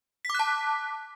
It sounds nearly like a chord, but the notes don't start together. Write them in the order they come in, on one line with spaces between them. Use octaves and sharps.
B6 D6 F#6 A5